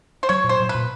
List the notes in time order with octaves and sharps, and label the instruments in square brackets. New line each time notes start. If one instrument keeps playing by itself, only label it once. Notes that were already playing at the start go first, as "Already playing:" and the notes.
[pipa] C5
[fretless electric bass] F#3 [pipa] C#5
[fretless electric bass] A#2
[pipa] C5
[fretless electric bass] A#2
[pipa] B4
[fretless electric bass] A#2